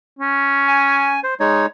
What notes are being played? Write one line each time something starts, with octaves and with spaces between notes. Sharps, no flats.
C#4
G#5
C5
G#3 D#4 C#5